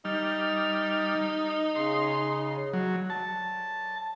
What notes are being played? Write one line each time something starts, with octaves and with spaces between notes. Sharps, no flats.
G3 D#4 F6
C#3 C6
F#3
A5